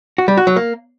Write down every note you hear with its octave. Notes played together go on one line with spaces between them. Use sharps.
F#4
G3
F#4
F#3
A#3